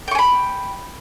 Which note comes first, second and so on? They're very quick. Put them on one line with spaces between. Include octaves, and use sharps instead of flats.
G5 C#6 G#5 B5